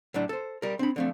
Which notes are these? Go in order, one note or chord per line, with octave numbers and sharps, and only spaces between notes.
A2 F#3 D4
A4 C5
G3 A#4
C4 D4 B5
D3 F3 A3 C4